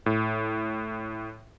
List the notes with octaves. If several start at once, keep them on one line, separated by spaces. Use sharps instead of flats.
A2